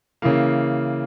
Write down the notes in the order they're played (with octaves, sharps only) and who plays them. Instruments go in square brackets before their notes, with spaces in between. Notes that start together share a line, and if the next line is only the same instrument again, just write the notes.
[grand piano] C#3 E3 A#3